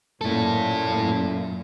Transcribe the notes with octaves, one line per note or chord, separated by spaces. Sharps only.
F#2 A#2 E4 A4